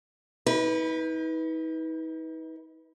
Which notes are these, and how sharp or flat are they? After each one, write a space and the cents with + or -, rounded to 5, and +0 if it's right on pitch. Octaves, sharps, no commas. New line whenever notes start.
D#4 +45 B4 -10